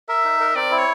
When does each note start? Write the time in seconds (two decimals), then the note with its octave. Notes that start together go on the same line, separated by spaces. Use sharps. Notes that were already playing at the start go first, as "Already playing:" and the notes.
0.08 A#4 E5
0.25 D#4
0.40 A#4
0.55 C4 D5
0.71 E4
0.78 C#5